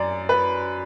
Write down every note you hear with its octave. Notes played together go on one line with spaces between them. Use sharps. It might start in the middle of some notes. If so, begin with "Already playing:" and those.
Already playing: F#2 D5
B4